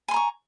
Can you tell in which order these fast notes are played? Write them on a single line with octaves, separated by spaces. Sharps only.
G#5 C6 A#5 C#6